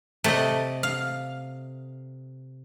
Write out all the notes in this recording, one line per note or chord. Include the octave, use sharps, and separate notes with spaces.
C3 A3 D5 D#5
F5